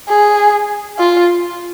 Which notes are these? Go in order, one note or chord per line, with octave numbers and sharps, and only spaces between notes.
G#4
F4